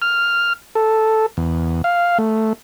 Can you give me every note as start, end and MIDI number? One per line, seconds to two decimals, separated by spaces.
0.02 0.53 89
0.75 1.26 69
1.37 1.82 40
1.84 2.18 77
2.18 2.53 57